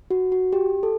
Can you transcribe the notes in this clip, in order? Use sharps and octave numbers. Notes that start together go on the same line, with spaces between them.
F#4
F#4
G4
A4